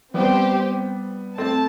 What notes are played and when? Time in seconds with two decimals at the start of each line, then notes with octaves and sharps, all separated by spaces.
0.14 G3 B3 C4 G4 C5
1.38 A3 C4 A5